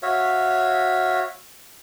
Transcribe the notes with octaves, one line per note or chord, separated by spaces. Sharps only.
F#4 C#5 E5 F5